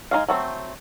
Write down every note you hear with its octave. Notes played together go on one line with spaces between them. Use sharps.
G#3 D#4 F#4 F5
F#3 A3 C4